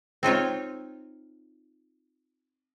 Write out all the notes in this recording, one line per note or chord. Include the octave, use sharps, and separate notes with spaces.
C4 D#4 F4 C#5